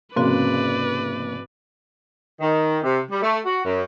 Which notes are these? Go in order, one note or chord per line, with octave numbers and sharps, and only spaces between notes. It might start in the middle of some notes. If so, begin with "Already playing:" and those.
F1 G#2 C#3 A#3 C4 F#4 B4 D5
D#3
C3
G3
A3
F#4
F#2